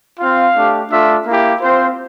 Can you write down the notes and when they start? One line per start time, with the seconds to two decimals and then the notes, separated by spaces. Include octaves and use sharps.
0.20 C4 F4 F5
0.56 A3 D4 G4
0.91 A3 D4 F4 E5
1.27 A#3 E4 G4
1.61 C4 F4 C5